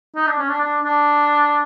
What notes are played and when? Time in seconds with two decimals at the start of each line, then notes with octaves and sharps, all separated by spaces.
0.16 D#4
0.27 D4
0.38 C#4
0.49 D4
0.60 D4
0.82 D4